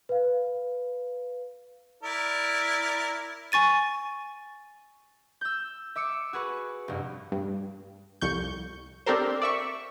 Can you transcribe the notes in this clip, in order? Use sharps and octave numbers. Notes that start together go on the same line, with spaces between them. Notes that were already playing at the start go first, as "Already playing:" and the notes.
B4 F5
E4 A#4 D5
G#5 C#6 A6 D#7
E6 G6
E5 D6 E6 C#7
F#4 G#4 B4 C#6
F1 G2
G2
C2 F2 C#6 G6
C4 D4 G4 A4 A#4 C5
D5 E5 C#6